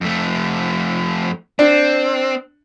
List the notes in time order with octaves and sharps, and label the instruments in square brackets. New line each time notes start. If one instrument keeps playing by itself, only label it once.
[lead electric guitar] F2 A3
[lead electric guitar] C4 [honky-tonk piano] D4